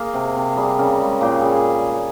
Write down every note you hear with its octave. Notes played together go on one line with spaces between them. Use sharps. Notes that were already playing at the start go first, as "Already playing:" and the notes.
Already playing: A#3 G#4
C3
C3
G3 G#4
C#3 A#4
G#3
A#2 G4
G3 G#4
G#4